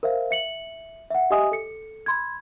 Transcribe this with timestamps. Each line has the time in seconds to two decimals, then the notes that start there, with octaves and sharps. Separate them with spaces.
0.03 A#4 C5 E5 F5
0.31 E5 C#7 F#7
1.10 E5 F#5
1.31 G4 D#5 E5 G#5 D#6
1.52 A4 C#7
2.06 B5 C6 G#6